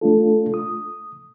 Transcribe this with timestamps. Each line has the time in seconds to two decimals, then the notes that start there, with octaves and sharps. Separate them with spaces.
0.01 A3 D4 F4 A4
0.54 D#6